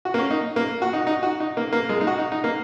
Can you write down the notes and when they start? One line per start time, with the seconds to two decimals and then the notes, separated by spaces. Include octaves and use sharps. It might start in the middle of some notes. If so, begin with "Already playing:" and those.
0.05 F#4
0.14 A#3
0.18 C#4
0.30 D#4
0.56 A#3
0.82 F#4
0.93 D#4
1.01 F#4
1.07 D#4
1.23 F#4
1.40 D#4
1.57 A#3
1.72 A#3
1.89 G#3
2.01 D#4
2.07 F#4
2.19 D#4
2.32 D#4
2.44 A#3